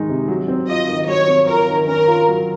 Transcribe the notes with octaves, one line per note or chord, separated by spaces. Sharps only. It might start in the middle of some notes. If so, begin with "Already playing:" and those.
Already playing: D#3 G#3 D#4
C3
F#3
C4
F4 D#5
D#3
F#3 C#5
C4
F4 A#4
D#3
C#4 A#4
F4
F#3